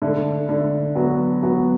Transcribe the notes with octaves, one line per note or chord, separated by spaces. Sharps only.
D3 A3
D3 A3
F#3 B3
F#3 B3